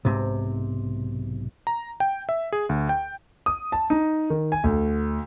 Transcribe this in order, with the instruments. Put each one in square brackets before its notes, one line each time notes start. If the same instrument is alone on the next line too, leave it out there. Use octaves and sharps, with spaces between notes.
[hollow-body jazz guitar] B1 G#2 C3
[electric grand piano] A#5
G5
E5
G#4
D2
G5
[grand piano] D#6
A5
D#4
D#3
G#5
D2